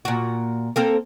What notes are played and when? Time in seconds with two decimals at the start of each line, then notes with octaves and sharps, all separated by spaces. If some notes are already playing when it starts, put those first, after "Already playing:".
0.05 A#2 F#4
0.76 A#3 C4 A4